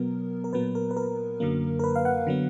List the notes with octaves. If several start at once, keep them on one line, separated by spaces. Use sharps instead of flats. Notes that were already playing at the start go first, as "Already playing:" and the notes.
Already playing: B2 F#3 B3 A#4
A#4
A#2 F#3 B3 B4
A#4
B4
A#4
F#2 D3 F#3 A#3
A#4
B4
F5
F#5
D3 F#3 B3